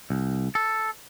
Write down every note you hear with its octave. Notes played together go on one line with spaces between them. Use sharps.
C2
A4